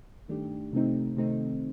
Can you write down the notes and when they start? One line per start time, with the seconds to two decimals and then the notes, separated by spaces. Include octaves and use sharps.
0.28 G2 D#3 A3 D4 G4
0.73 C3 D#3 A3 C4 D#4
1.17 C3 D#3 A3 C4 D#4